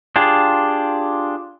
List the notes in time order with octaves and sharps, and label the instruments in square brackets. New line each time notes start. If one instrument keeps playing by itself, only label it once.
[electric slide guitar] D4 F4 G4 G#4